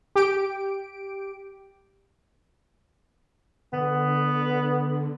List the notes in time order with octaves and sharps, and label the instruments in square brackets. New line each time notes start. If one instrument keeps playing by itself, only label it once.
[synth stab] G4 D7
[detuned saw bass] D3 [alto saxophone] B3